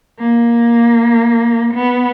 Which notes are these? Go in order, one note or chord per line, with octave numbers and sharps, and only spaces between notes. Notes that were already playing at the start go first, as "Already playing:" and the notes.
A#3
B3